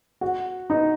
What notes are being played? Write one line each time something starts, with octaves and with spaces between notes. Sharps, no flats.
F#4
D#4